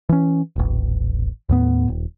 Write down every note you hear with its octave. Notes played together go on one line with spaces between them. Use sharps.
E3 C#4
D#1 A1
D#2 A2 B3
D#1